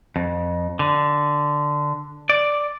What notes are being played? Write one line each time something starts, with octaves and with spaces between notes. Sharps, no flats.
F2
D3
D5